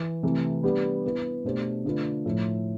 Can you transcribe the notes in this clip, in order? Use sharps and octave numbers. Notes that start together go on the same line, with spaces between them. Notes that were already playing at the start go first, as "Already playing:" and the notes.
Already playing: E3
C3 E3 A3
G3 B3 D4 G4
B3 E4 B4
B2 A3 D4 G4 C5
D3 A3 D4 F4 B4
A2 F3 A3